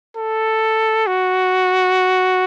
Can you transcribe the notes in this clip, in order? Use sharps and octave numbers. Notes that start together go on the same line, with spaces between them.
A4
F#4